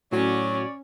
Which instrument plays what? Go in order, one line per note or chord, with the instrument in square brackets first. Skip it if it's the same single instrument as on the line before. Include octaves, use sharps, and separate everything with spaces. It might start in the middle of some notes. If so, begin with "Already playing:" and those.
[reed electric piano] A2 F#4 G#6 [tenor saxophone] F#3 [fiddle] C#4 [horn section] C#5 D5